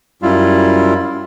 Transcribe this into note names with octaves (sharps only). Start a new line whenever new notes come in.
F#2 G3 E4 F4